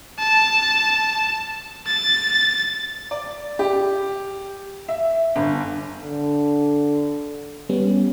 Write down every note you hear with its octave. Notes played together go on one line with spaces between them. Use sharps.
A5
A6
D5
G4
E5
G1
D3
G3 B3 C#4